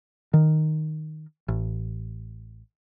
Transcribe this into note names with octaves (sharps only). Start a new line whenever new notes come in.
D#3
A1